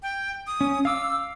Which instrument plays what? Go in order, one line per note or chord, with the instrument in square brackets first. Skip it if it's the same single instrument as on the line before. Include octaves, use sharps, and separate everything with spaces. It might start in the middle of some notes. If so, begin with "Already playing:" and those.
[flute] G5
D#6
[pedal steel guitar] C#4
[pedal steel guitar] F5 D6 [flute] E6